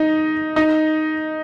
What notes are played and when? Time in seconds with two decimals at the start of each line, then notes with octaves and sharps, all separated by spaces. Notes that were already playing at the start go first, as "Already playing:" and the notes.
Already playing: D#4
0.56 D#4